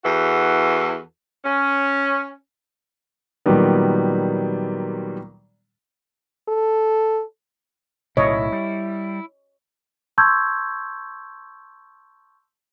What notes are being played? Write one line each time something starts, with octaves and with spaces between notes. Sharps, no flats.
E2 E3 F#4 A4
C#4
A#2 D#3 F#3 G3 B3
A4
B1 A2 C#3 E4 C#5 D#5
G3
A5 C6 C#6 E6 G6 G#6